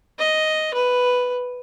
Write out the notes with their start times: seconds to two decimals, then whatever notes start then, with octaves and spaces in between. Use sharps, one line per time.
0.19 D#5
0.74 B4